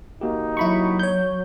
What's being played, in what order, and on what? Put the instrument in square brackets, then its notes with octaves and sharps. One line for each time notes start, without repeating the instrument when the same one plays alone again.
[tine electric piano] A#3 F#4 G4 [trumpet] D#4
[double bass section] F#3 [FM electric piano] E4 B5 C#6
[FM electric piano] C#5 G6